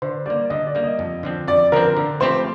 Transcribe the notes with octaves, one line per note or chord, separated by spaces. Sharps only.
D3 C5
G3 A#3 D5
D3 D#5
D5
G3 A#3
D#5
F2
D3 F3 C4
F2 D5
D3 F3 C4 A#4
D3
F3 A3 C4 G4 C5